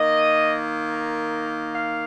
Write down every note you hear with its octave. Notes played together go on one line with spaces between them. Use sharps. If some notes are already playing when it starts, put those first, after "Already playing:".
Already playing: D#3 A#3 D#5
F5